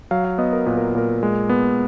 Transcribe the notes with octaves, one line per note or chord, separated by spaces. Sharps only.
F#3 F5
F5
B3 D#5
A#4
A#2 B4
A#4
A#2 A#4
G#3
B3